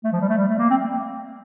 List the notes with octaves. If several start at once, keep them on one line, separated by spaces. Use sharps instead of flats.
A3
F3
G3
A3
G3
A3
A#3
C4